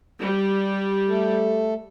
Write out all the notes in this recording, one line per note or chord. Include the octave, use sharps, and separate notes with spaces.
G3
A3 A4